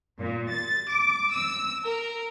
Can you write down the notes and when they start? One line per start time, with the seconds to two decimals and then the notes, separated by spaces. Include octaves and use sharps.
0.19 A#2
0.50 A6
0.89 D6
1.33 E6
1.85 A#4